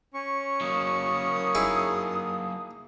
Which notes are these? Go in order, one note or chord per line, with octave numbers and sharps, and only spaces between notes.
C#4 C#6
F#3 A#3 D#6
D#4 E4 G#4